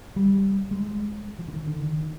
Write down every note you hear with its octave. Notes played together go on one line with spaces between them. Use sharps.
G3
G#3
F3
D3
D#3
D3
D#3